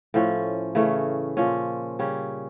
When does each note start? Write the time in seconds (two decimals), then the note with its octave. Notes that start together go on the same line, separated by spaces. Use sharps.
0.14 A2 F3 C#4
0.75 C#3 E3 A3 C#4
1.37 A#2 F3 C#4
1.99 C#3 G3 C#4